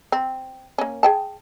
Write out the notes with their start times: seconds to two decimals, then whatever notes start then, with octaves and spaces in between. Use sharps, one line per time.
0.12 C4
0.78 A#3 C#4
1.03 G#4 G5 A5